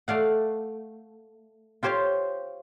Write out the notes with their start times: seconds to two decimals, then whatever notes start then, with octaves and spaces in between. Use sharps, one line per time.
0.08 A3 D5 F5 F#5
1.83 F4 G4 C5 C#5 F5